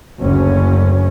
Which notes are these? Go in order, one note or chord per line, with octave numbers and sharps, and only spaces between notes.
F#1 D2 C#4